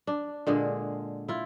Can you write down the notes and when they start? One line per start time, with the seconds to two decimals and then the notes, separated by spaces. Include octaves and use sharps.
0.07 D4
0.47 A#2 D3 G#3 G#4
1.28 E4 F4